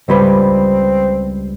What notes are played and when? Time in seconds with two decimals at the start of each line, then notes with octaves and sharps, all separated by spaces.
0.08 C#2 G3 C4 B4